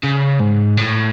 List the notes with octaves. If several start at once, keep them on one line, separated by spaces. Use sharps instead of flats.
C#3
G#2
A2